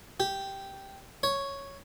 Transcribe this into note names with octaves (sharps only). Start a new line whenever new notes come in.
G4
C#5